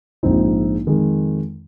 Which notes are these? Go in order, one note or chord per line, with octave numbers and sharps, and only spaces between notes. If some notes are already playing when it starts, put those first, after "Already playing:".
A#1 G#2 F3 C4 D#4
F2 D#3 G#3